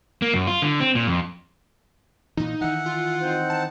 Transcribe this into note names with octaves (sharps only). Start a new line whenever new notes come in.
A#3
F#2
F4
D3
C4
A#2
F2
A#2 E3 D#4
D#3 E3 E5 F#5 G#5
F4
C4 D#4 C5
A5